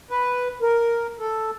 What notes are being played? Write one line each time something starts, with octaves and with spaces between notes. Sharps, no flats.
B4
A#4
A4